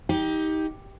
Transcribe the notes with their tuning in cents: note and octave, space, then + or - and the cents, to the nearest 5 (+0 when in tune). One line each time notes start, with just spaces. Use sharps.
D#4 +25 G4 +0